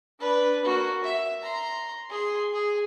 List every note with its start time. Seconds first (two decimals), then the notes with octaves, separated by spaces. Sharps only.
0.20 D4 B4
0.65 A#3 F#4
1.04 E5
1.42 A#5 C6
2.10 G#4 C6
2.53 G#4